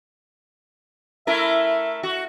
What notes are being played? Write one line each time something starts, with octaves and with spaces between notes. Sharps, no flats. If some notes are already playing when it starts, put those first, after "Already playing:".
A3 E4 A#4 E5
F#4